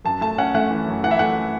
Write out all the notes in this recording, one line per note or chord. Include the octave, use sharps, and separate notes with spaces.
F#2 A5
A3 A5
C#4 F#5
A3 F#5
E3
F#2
E3 F#5
E5
A3 F#5